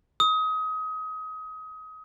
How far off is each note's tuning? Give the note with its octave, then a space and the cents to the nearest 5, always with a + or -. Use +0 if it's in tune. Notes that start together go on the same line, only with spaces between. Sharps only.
D#6 +25